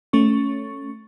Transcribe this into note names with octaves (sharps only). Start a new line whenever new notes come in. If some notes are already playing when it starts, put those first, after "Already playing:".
A3 C#4 C#6